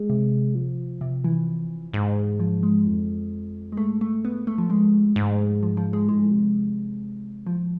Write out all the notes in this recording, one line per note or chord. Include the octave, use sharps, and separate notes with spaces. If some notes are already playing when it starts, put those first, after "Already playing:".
Already playing: G#3
C3
F3
C3
E3
G#2
F3
G#3
F2
G#3
G#2 A3
A3
B3
A3
A2 F3
G#2 G#3
G#2
F3
F3
G#3
A2 G#3
G#2
A2
C3
A2 F3